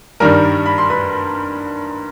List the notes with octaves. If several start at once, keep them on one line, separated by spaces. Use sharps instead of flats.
G2 D#3 G3 A#4 A#5
B5
C6
B4 B5